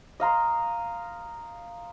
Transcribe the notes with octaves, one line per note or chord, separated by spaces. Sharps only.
D#5 F5 A#5 C6